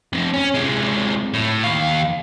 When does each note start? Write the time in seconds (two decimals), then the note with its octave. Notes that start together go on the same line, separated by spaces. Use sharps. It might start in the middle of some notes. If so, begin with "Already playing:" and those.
0.13 F2 C3
0.33 C#4
0.54 C3 G#3
1.34 A2
1.64 D#2 F5